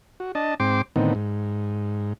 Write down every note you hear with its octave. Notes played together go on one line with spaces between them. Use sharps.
F#4
D4 D#5 A5
G#2 C4 G5 C6 D6
A2 D3 D#3 B3 C4 D#4
G#2